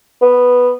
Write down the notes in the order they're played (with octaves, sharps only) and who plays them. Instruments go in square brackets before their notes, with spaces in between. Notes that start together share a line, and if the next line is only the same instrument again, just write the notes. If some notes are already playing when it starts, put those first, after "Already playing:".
[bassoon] B3